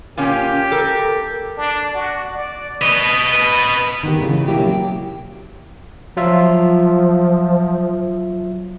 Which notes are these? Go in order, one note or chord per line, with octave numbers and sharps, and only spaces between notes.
A#2 A#3 C#4 G4
A4 A#4
D4
F#4
D5
B4 D#5
D#3 B3 G4
C#3 E3 G#3
B2 F#3 A#3 E4 G4
A#3 G5
F3 F#3 F4 E5